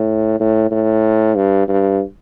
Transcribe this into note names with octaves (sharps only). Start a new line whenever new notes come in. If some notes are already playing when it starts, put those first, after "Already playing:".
Already playing: A2
A2
A2
G2
G2